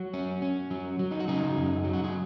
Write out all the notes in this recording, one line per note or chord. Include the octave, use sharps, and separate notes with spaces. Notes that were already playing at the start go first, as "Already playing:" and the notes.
Already playing: F#3 F#4
C#4
C#4
F#3
F#3
D#4
F#4
C#3 D#4 G#4
F#2
F#3
F#4
G#4